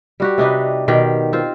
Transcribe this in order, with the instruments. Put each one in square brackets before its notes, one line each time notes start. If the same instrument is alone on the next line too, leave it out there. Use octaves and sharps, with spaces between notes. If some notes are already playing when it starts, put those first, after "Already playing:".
[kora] G3 F#4 G4
C3 D4 D#4 B4
B2 D#3 G4 G5
C4 F4 C5